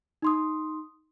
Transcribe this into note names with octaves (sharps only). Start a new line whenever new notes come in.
D#4 C6 D#6